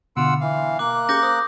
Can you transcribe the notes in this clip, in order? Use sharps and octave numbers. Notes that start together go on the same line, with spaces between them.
B2 D3 F4 F#5 E6
E3 F5
A#3 D6 F#6
C#4 G4 G#4 D6 G6 A#6
C5 D#6